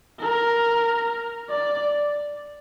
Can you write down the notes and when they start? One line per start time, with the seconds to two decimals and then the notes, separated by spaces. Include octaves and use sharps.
0.20 A#4
1.50 D5